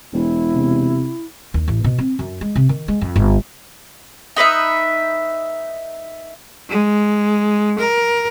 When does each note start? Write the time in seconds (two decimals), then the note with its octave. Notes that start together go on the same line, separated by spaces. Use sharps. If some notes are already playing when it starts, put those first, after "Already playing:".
0.13 E1 E4
0.55 C3
1.54 D#2
1.68 A1
1.84 B2
1.98 C4
2.19 F#2
2.41 G#3
2.55 C3
2.69 D#3
2.88 G#3
3.01 F2
3.16 G1
4.36 D#4 B4 D#5 E5
6.70 G#3
7.80 A#4